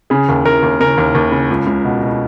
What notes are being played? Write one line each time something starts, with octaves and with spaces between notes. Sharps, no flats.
C#3 G#4
D#2
D#2 A#4
D#2
C#3 A#4
D#2
D#2
C#3
C#2
C#2
B2
B2